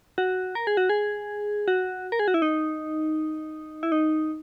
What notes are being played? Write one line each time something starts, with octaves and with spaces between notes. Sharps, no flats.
F#4
A#4
G#4
F#4
G#4
F#4
A#4
G#4
F#4
E4
D#4
E4
D#4